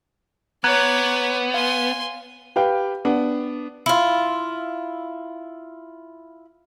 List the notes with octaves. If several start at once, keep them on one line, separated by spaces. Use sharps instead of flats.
B3 C#5 A#5 D6 F#6 G#6
F5 G#5 C6
G4 B4 F5 G5
B3 D4
E4 F4